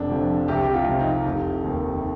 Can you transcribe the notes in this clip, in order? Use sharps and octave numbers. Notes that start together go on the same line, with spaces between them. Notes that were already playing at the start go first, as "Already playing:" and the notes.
Already playing: F1 D4
F2 D3 F3
C2 G4
G4
F4
C3 F3
D#4
F1
D#2 D#3